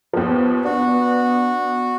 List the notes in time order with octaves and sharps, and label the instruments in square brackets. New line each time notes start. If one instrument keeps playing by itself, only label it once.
[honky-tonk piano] D#2 F3 [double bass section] B3
[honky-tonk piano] D4 [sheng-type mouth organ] F#4